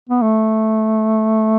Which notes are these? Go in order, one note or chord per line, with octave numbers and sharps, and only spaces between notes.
B3
A3